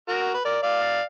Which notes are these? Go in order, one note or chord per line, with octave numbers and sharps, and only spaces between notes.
F#4 A#4
B4
A#4 D5
D5 F5